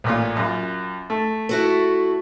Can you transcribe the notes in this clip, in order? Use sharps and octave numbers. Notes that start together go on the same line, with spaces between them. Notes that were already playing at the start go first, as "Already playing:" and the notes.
A1 A#2 F4
F#2 F4
A3
E4 F#4 A4